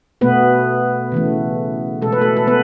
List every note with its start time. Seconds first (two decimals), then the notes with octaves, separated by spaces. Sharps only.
0.21 B2 A3 B3 B4
1.12 C#3 E3 A3
2.02 B2 G#3 A4
2.12 B4
2.22 A3 A4
2.37 A4
2.47 B3 B4